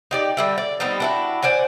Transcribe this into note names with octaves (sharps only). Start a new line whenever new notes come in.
D#4 G4 D5
D3 G3 E5
D5
G3 B3 C4 D#4
D4 E4 F#4
C5 D5 F#5 G#5